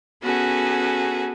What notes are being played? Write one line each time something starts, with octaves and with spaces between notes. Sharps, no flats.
B3 C#4 F#4 G#4 A4